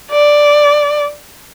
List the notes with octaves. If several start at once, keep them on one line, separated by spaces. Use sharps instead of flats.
D5